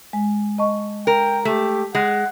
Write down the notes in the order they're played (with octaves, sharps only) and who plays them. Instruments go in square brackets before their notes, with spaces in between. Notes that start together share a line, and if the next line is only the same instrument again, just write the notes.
[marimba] G#3
D#5 A5 C#6
[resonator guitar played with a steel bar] A#4 [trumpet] G5
[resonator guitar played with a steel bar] A3 [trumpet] G4
[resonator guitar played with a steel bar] G#3 [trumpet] F#5